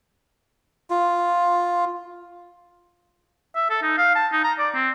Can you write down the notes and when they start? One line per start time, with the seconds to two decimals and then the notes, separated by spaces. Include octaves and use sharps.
0.90 F4
3.56 E5
3.70 A4
3.83 D#4
3.98 F5
4.15 A5
4.32 D#4
4.44 A#5
4.58 D5
4.75 C4